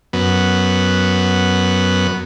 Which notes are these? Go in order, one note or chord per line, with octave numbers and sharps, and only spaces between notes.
F#2 B3